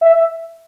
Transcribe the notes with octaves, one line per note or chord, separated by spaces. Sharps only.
E5
E5